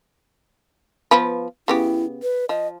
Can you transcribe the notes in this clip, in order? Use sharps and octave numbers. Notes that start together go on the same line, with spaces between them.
F3 B3 B4
C#3 B3 E4 G4
B4
F3 D#5